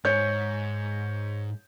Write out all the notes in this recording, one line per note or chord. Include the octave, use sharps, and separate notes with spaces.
G#2 C#5 G6